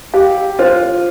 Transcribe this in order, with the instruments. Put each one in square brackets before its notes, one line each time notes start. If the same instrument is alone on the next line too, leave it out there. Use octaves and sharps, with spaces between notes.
[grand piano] G4 [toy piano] F5
[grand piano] F4 [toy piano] C5